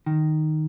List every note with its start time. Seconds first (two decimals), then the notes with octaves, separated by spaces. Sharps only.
0.06 D#3